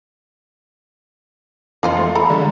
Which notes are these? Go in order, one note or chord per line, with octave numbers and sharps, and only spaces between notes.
F2 A#3 F4 C5
A3
A4 A#5 B5
D3 G3 G#3